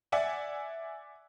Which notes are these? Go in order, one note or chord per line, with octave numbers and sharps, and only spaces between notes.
D5 E5 F#5 G#5